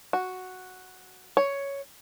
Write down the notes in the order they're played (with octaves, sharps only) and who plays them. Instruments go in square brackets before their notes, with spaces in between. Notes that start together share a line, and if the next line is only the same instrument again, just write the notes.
[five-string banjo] F#4
C#5